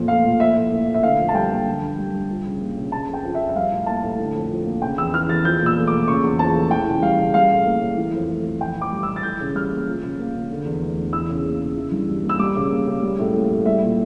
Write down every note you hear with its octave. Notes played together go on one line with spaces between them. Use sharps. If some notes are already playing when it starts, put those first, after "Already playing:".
Already playing: F2 A#2 F3
A3 F5
A#2
F3 E5
A2
A#3
A2
E5
D3 F5
F2
A5
G3 G5
A#3
D3
G2
G3
G2
F3
C#3
A#3
C#3
C#3 A5
F2
G5
F3
E5
F2
E5
G3 F5
A2
A#3 A5
A2
D3
F2
F3
A#3
C#3 G5
E2 E6
E3 F6
E2 A6
F3 G6
A#2 E6
A3
D6
A#2
C#3 C#6
E2
F3 A5
A3
E3 G5
C#3
G3 F5
C#3
G3 F5
A2
A#3
A2
E3
F2
A3
F2
E3 G5
A2
D6
G3
E6
A2
A6
E3 G6
C#3
G3 F6
A#3
F3
C#3
A#3
C#3
D3
E2
A3
E2
E3 E6
C#3
A#3
C#3
E3
G2
G3
A#3
E6
G3 D6
C#3
A#3
C#3
G3
A2
A#3
A2
G3 E5
A#2